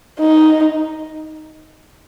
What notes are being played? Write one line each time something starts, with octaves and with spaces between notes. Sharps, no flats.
D#4